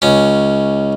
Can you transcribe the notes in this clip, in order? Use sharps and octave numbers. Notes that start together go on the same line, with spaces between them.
C#2 C#4